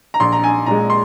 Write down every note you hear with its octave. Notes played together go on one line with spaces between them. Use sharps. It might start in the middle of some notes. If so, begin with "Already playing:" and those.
A#5
A#1 C6
A#5
G#5
A#2 G#3 A#5
C6